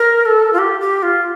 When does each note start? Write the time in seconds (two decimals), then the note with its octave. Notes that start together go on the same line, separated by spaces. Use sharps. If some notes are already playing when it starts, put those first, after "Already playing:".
Already playing: A#4
0.25 A4
0.53 F4
0.58 G4
0.81 G4
1.03 F4